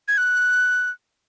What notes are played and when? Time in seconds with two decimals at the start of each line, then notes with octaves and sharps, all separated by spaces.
0.08 G#6
0.18 F#6